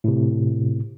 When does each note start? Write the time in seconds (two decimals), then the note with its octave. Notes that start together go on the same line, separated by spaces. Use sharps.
0.04 A2 C3